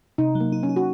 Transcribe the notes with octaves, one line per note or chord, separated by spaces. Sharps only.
C3 D#4
F#3
A#3
D#4
C#4
D#4
F#4